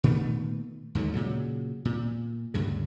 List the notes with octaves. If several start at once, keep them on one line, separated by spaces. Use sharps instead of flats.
A#2 D#3 A3 B3
D#2 G#2 D3 F#3
A#2 C#3 F#3
A#2
D2 G2 C#3